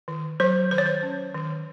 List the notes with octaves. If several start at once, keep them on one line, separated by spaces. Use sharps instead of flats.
D#3
F#3 C5
D#3 C5
C#5
C5
C#4
D#3